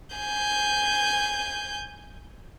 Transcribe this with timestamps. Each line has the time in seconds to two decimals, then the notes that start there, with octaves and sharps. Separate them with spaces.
0.16 G#5 G6